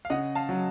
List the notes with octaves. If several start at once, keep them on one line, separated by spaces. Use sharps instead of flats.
F5
C#3 D#5 F#5
F5 A5
F#3